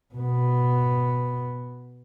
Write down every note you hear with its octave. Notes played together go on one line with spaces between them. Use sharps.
B2 B3